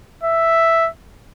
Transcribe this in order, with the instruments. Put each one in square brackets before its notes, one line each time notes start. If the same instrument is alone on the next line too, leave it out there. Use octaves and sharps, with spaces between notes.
[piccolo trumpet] E5